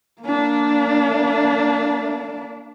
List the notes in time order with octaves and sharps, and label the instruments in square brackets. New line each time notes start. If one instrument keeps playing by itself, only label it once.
[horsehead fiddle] A#3 D4